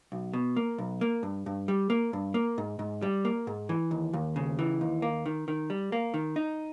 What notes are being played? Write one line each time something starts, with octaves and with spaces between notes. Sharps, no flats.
B1
B2
A#3
B1
A#3
G2
G2
G3
A#3
G2
A#3
G#2
G#2
G3
A#3
G#2
E3
D#2
D#2
C#3
E3
D#2
A#3
D#3
D#3
G3
A#3
D#3
D#4